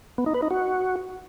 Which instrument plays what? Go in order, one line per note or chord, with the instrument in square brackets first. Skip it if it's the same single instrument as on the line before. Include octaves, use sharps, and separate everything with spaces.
[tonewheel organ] B3
D#4
B4
D#4
F#4